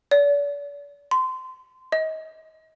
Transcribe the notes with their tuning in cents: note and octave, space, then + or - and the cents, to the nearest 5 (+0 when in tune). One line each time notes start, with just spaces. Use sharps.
D5 -40
C6 -20
D#5 +30